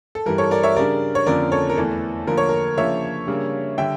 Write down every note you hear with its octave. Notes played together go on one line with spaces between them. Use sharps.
A4
G2 E3 G3 A#4
A4 C#5
A#4 D5
C#5 E5
C#3 G3 D4 A#4 D5
C#5
F2 D3 F3 A#3 C#4 A#4 D5
A4 C#5
A#4
E2 E3 A3 A4
D3 F3 A#3 A#4
C#5
A#4
C#3 F3 A#3 D4 C#5 E5
C#3 G3 A#3 D4
D3 G3 E5 G5